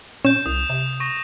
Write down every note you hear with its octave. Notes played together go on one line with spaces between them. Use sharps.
A#2 C#4 G6 E7
C2 D#6
C3
C#6 A#6